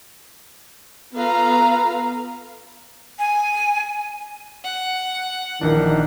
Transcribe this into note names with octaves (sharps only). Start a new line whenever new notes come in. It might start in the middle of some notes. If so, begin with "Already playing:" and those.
B3 F4 A4 B4 F5 A#5
G#5
F#5
A#1 D#3 E3 D4